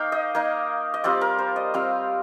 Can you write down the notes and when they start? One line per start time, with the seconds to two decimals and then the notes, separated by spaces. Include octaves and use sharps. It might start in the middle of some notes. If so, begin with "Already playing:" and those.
Already playing: A#3 D#4 F5 G5
0.12 D#5
0.35 A#3 D#4
0.94 D#5
1.04 G3 C4 F4 D5
1.21 A#4
1.39 C5
1.56 D#5
1.74 G3 C4 F4 F5